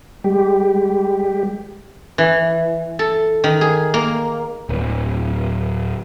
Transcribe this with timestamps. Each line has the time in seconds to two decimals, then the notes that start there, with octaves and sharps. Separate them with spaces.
0.24 G3 G#3 G4
2.18 E3
2.99 A4
3.44 D#3
3.61 G#4
3.94 A#3
4.69 D1